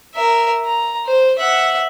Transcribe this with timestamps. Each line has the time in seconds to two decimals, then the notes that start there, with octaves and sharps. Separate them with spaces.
0.15 A#4 E5
0.65 A#5
1.06 C5
1.38 E5 F#5